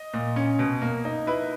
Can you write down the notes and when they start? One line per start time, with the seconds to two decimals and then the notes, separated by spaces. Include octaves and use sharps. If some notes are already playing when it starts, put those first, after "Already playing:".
Already playing: D#5
0.14 A#2
0.36 C#4
0.59 B2
0.82 A#3
1.05 D#4
1.27 E4 B4